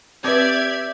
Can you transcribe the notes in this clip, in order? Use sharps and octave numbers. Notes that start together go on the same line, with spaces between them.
C4 G4 B4 D5 E5 G#6